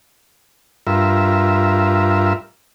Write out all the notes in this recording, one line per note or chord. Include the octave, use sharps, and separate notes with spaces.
G2 F4 A#4 E5